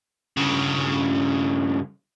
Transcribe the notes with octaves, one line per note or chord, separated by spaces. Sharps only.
G2 C#3